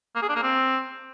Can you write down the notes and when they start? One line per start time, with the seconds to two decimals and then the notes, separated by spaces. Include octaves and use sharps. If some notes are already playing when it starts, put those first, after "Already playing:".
0.15 A#3
0.22 G#4
0.29 D4
0.36 A#3
0.42 C4